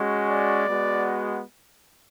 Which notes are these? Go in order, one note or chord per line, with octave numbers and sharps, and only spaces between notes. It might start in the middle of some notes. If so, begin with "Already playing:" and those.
Already playing: G#3 C#4 F#4
D5
G#3 B3 F#4